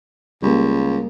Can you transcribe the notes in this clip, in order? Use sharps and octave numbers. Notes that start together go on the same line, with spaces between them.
C#2 G3 A#3